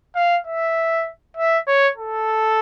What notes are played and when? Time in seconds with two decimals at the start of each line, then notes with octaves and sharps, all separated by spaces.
0.15 F5
0.46 E5
1.37 E5
1.67 C#5
1.97 A4